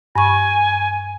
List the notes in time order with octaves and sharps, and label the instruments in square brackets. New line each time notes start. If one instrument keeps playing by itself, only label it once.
[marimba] G2 C#6 [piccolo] G#5